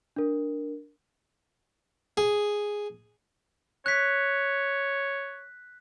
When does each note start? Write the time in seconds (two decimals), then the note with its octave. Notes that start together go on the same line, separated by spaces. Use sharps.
0.16 D4 A#4
2.17 G#4
3.86 C#5 F#6 B6